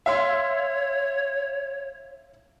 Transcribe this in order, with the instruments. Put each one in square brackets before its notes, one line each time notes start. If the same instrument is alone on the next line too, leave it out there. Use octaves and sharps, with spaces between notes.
[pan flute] C#5 [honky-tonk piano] E5 F5 C6